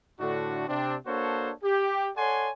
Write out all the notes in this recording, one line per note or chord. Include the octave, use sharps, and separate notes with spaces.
A2 D3 A3 D4 F#4
C3 C4 D4
A#3 D4 F#4 A4 C5 C#5
G4
A4 C#5 D5 F#5 G#5 C6